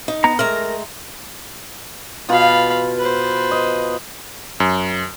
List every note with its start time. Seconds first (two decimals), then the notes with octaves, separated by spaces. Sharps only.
0.08 D#4
0.24 B3 A#5
0.39 G#3 A3 A#4 A#5
2.29 B2 F4 F5 B5
2.99 B4 C5
3.51 D#5
4.60 F#2